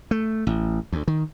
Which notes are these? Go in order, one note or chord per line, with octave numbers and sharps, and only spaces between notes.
A3
A1
D2
D#3